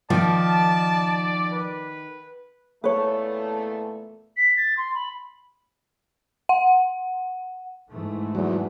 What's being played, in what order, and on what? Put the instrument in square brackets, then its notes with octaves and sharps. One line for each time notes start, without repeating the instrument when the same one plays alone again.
[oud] D#3 [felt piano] F3 [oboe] D5 [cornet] A5
[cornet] B4
[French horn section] E2 A#2 A3 [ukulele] B4 C#5
[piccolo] B6
A6
C6
B5
[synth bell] F#5
[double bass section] G#2 E3 A3
[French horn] E2 [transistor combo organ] F#3